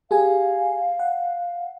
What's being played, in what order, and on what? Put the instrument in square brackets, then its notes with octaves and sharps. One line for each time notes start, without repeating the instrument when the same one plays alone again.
[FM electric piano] G4 G#4 G#5 [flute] F5
[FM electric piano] F#5